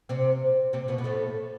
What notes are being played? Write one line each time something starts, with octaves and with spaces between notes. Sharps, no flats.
C3 C4
C3 C4
B2 B3
B3
A2 A3